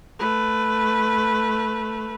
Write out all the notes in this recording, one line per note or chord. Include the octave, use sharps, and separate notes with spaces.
A3 B4